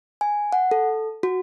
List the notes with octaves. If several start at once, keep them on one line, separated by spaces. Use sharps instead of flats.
G#5
F#5
A4
F#4